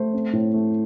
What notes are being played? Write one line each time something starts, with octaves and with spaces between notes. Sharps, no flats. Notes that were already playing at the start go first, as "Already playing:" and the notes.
Already playing: A3 C5
C4
A2
A3